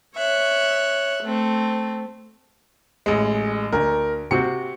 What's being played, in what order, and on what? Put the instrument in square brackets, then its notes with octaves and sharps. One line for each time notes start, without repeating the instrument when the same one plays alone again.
[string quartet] C#5 E5 F#6
A3 C4
[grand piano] A1 G#3
[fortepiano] D2 [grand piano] A#4
[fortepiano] C3 C4 F#4 [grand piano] C#7